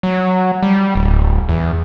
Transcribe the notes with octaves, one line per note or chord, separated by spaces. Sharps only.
F#3
G3
D1
E2